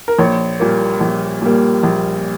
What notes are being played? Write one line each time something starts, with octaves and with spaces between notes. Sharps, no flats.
A#4
A#1 C#5
A#2 G3 A#3
A#1
A#2 G3 A#3
A#1